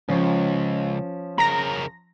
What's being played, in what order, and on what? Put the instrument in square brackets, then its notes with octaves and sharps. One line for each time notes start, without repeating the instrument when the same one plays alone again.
[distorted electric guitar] C#2 [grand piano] F3 C#4
[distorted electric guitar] C#3 A#4 [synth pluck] A#5 A#6